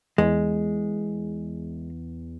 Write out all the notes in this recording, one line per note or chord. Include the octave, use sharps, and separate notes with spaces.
E2 G#3